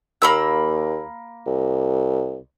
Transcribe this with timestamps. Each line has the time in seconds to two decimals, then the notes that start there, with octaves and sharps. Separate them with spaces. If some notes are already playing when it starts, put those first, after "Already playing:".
0.22 D#2 A#3 B5 E6
1.46 C2